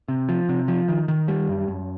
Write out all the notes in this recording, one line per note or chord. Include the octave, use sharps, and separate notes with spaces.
C3
F3
C3
F3
D#3
D#3
G3
F#2
F#2